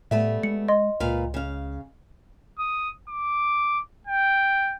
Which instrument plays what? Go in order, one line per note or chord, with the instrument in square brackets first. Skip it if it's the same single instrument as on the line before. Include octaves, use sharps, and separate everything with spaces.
[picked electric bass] A2 [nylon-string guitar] G3 A3 B3 [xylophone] E5
[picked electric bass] G#3 [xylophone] C#7
[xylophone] D#5 C6
[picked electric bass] C#2 [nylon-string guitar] A#2 B4 F5
[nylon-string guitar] C#3 F5
[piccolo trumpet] D#6
D6
G5